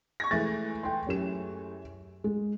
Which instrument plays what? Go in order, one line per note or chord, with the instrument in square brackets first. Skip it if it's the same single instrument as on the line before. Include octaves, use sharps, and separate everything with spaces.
[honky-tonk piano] C#6 G#6 A#6
[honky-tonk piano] E3 G#3 A3 [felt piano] A6
[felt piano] G5 C6
F#2 G4 E7
G#3